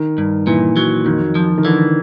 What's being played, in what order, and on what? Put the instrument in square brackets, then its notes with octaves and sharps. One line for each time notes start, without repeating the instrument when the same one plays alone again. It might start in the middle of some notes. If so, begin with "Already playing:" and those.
Already playing: [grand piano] D#3
[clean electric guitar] G2
[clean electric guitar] A#2 [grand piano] E3
[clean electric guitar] F#3
[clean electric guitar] F2 [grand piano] D#3
[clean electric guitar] F3
[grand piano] D#3
[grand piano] D3 [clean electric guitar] E3